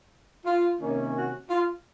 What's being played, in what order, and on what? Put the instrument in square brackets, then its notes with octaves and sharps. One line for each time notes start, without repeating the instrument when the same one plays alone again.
[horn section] F4
C3 D#3 A#3 C#4
F#4
F4